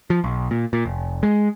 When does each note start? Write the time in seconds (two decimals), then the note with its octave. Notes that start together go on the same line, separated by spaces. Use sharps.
0.10 F3
0.24 B1
0.51 A#2
0.73 A#2
0.86 F1
1.23 G#3